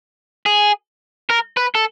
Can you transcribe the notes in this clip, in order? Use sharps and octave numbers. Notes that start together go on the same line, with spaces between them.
G#4
A#4
B4
A4